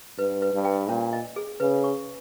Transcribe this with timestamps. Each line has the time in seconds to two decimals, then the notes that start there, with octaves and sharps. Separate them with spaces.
0.18 G2 B4
0.42 B4
0.54 G2
0.65 G5
0.89 A#2 C#4
1.13 D#5
1.36 G#4
1.60 C#3 B4
1.84 C#6